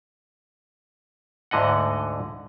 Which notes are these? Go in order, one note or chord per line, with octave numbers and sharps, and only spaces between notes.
D2 G#2 D3 D#5 F#5